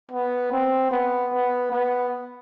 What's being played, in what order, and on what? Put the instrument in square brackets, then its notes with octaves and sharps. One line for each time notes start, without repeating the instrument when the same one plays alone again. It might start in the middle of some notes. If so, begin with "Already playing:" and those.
[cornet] B3
C4
B3
B3
B3